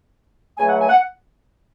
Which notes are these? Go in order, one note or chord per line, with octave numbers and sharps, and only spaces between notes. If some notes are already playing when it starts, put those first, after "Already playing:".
C#2 C#3 F#3 A3 G#5
F#5
G#5
F#5